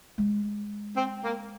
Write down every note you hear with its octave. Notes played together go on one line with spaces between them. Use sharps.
G#3
C4
A#3